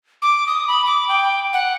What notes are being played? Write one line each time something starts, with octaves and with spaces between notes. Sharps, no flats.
D6
D#6
B5
D6
G5
F#5